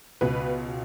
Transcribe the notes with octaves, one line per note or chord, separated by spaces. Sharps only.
C#2 B2 B4